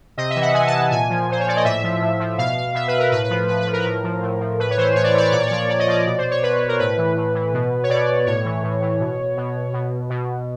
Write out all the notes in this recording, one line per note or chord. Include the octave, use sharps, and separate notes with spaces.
C3 D#5
E5
E3
F#5
C3 G#5
A5
E3
A5
A#2 G#5
F3
A#2 C5
C#5
F3 D5
D#5
A2 E5
F3
A2
F3
B2 F5
F5
B2 E5
B4
A#4
A2 B4
B4
F3
A2 B4
B4
F3
A#4
B4
A2 A#4
F3
A2
F3
A2 B4
C#5
E3 C5
A2 C#5
D5
C#5
E3 D5
C#5
A#2 D5
C#5
D5
F3 C#5
A#2 D5
D#5
F3 D5
B2 D5
C5
C#5
B2 B4
A#4
A2 B4
E3
A2
E3
B2
C#5
B2 D5
A2 C#5
E3
A2
E3
B2
B2
B2
B2